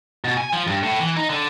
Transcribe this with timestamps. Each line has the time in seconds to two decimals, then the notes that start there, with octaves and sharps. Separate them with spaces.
0.24 B2
0.37 G#5
0.53 F3
0.67 G2
0.83 A2
0.99 E3
1.17 D#4
1.29 D3